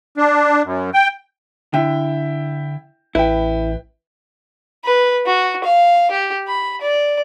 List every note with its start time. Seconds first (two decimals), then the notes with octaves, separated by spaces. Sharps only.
0.17 D4
0.64 F#2
0.94 G5
1.74 D3 E4 E5 G5
3.15 A1 E4 B4 G5
4.85 B4
5.26 F#4
5.64 F5
6.11 G4
6.48 B5
6.81 D5